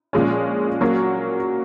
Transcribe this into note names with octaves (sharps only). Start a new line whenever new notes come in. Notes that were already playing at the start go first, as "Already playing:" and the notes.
A#2 F3 G#3 C#4
F#3 A#3 C#4 F#4